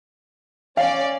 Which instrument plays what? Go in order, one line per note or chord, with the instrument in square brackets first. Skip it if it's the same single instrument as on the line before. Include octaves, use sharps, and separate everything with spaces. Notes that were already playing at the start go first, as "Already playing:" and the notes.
[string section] C#4 D5 [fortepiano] F5